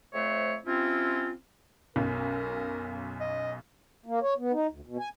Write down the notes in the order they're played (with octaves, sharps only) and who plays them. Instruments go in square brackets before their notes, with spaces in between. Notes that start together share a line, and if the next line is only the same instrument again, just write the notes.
[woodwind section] F2 A3 C5 C#5 E5
C3 C4 C#4 E4 F4
[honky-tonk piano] B1 F#2 [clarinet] A#4
[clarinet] D#5
[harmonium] A#3
C#5
B3
D#4
D2
B2
G#5